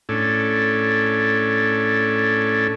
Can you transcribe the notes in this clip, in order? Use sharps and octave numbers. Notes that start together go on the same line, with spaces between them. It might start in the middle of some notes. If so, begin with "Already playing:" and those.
A2 C#4 D4 A4